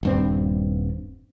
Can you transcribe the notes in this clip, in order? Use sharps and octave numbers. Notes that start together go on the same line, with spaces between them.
D#1 G2 C4